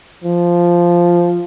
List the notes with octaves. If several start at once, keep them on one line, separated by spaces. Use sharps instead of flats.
F3